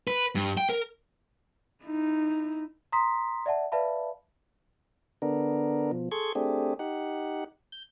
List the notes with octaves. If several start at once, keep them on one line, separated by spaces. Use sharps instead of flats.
B4
G2
G5
A#4
D#4 E4
A#5 C6 D#6 B6
D5 E5 F#5 A5
B4 D5 E5 F5 A5 B5
D3 B3 D4 A#4
B2 F3
G#4 A4 C6 C#6 G#6
A3 C4 D4 G4 G#4
D#4 G4 F#5
G6